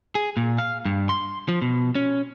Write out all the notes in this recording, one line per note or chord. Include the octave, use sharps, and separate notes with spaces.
G#4
A#2
F5
G2
C6
F3
B2
C#4